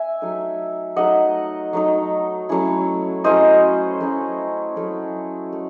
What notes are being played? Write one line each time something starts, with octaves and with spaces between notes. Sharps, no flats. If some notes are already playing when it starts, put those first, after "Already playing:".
Already playing: E5 G#5
F#3 A3 D#4
F#3 A3 D#4 D#5 F#5
F#3 A3 D#4
F#3 A3 C#4 E4
F#3 A3 C#4 E4 C5 D#5
F#3 A3 C#4 E4
F#3 A3 C#4 E4
A3